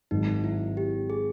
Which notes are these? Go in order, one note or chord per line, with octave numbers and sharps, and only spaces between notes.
G#1 G#2 D#3 F#3 D#4
E4
G4
G#4